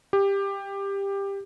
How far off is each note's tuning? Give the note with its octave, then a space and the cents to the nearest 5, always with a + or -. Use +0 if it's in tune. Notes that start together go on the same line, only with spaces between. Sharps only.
G4 +15